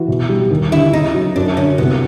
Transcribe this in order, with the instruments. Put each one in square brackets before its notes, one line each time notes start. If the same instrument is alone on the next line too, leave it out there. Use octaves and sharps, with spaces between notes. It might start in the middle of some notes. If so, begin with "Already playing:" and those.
Already playing: [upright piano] E3 [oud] F#4
[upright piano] B2
G3
D#2
[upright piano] D3 [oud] E4
[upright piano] C#3 [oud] D#4
[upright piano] F#3
[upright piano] F#2 [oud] D4
[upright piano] D3 [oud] C#4
[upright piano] C2 [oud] B3